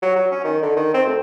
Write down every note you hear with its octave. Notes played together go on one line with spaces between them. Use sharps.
F#3
F#3
C#4
D#3
D3
D#3
C4
D2